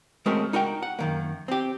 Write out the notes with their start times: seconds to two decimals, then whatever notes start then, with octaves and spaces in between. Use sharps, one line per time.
0.26 G#3 A3 C4 C#4 F#4 A#4
0.53 D#4 F#4 A#4 F#5 G5
0.83 F#5
0.99 F#2 D#3 A#3
1.48 C4 G4